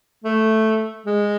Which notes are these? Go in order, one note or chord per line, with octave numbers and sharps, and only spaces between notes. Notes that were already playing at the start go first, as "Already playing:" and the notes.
A3
G#3